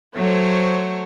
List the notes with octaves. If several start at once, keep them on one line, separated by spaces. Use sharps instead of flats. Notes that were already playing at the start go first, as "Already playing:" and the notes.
F#3 A3 C5 C#5